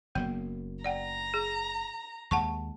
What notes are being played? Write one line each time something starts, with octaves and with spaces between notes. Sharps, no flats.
F#1 F#3 A#3 B3
D5 F#5 G5 A#5
G#4
D#2 G#3 F#5 A5 C#6